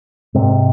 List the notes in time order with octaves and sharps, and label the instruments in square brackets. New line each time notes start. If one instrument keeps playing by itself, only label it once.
[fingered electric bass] G#2 C3